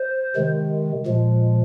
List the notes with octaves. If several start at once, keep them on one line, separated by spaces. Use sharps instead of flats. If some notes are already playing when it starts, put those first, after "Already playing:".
Already playing: C5
C3 D#3 G#3
A#2 F3 G#3